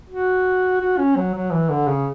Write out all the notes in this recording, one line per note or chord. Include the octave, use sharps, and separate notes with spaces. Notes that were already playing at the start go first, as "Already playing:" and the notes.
F#4
F#4
C#4
F#3
F#3
E3
D3
C#3